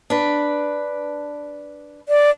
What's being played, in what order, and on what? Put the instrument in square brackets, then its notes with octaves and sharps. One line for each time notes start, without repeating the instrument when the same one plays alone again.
[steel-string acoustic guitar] D4 B4
[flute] D5